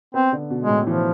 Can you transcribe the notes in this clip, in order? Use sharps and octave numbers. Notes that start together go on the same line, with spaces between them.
B3 C4
D3
B2
G#3
A2
E3 F3